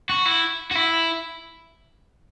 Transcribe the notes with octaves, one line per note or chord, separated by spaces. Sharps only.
F#4
E4
F#4
E4